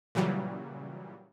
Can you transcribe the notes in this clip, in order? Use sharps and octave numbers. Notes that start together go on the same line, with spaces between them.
A#2 C#3 E3 F#3 G3